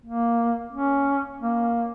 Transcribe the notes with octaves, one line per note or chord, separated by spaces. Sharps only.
A#3
C#4
A#3